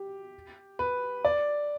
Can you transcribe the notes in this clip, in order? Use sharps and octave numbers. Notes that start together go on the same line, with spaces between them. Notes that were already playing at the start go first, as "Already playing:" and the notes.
Already playing: G4
B4
D5